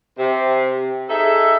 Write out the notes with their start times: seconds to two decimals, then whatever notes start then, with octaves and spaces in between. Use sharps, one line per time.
0.19 C3
1.10 D#4 G#4 A4 E5